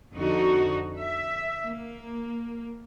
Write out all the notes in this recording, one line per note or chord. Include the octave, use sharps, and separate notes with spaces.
F2 D3 D#4 F#4
E5
A#3